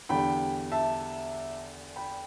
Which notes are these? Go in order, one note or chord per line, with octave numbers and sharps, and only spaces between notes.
E2 D3 G3 G5 B5
E5 A5
G5 B5